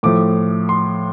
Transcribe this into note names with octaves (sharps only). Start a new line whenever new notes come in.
A2 F3 A3 D6
C6